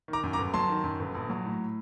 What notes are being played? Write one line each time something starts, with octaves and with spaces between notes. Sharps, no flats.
D#3
A#5 D6
F#2
A#5 D6
G1
F#3 A5 C6
D#3
F#2
G1
A#1
F#3
A2